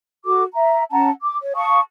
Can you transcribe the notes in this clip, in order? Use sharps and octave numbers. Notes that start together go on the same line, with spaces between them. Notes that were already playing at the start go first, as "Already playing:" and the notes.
F#4 A4 D6
E5 A#5
C#4 F#5 A5 A#5
D6
C#5
F5 A5 C#6 D#6